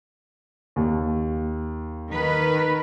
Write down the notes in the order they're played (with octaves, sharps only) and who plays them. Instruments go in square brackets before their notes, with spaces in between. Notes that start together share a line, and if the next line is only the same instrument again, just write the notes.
[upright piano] D#2
[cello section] D#3 A#4 B4